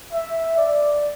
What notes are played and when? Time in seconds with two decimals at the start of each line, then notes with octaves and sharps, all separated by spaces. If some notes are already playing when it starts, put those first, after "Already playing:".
0.13 E5
0.57 D5